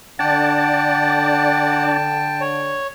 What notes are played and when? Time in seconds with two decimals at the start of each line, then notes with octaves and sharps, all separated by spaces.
0.19 D3 D4 D5 F#5 G5 A5
2.41 C#5